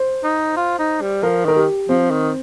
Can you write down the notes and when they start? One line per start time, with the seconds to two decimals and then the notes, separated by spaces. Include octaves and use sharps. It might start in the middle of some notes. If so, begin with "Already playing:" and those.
Already playing: C5
0.24 D#4
0.56 F4
0.79 D#4
1.01 G3
1.23 F3 A#4
1.45 D#3 A#4
1.56 G4
1.89 F3 C4
2.11 D#3